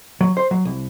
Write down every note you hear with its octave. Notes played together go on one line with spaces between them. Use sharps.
F#3
C5
F#3
C2